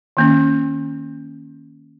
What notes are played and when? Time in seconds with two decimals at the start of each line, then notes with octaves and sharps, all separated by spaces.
0.17 D#3 A#3 C#4